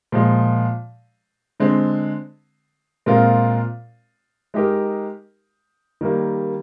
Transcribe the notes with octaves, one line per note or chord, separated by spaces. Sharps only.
A#2 F3 G#3
D3 G#3 C4
A#2 G#3 C4 F4 A#4
G#3 D#4 G4 A#4
D#3 G3 A#3